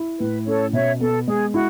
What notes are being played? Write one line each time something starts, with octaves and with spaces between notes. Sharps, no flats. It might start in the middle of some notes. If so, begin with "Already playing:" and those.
Already playing: E4
A2 B4
C#4 A4 C#5
B2 C#5 E5
B3 A4
G#3 G#4
E4 F#4